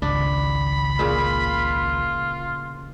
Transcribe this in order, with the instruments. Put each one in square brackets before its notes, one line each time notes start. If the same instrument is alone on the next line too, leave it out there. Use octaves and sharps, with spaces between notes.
[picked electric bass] G#1 C#2 [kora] D4 [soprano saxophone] B5
[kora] A#2 C#3 [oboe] F4